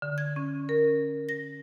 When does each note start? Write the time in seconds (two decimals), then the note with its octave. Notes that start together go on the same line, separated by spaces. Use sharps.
0.02 D3
0.18 G#6
0.36 C#4
0.69 A#4
1.29 A#6